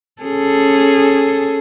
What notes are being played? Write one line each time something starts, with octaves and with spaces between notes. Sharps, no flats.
C#4 G#4 A4